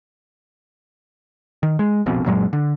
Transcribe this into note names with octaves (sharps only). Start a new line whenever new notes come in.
D#3
G#3
F1 A#1 F2 B2
F#2 A#2 F#3 G#3
D3